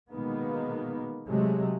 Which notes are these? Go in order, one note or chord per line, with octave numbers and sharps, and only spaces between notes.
B2 D#3 G#3 A#3 B3
C3 F#3 G#3 A3